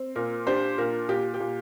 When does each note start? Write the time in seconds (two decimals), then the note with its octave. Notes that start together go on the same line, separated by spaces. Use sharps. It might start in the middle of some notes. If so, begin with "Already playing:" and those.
Already playing: C4
0.15 A#2 A#4
0.47 D4 G4 C5
0.78 A#2 A#4
1.09 A#2 G4
1.34 G4
1.40 A#2